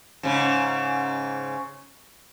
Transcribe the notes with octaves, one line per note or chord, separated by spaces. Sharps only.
G#2 C#3